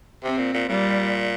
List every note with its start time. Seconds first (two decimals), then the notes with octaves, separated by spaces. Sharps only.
0.24 C3 C4
0.38 A#2
0.54 A#2
0.69 A#2 G3